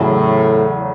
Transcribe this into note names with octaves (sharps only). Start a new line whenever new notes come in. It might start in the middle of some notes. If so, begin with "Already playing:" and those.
Already playing: E2 A2 C#3 F#3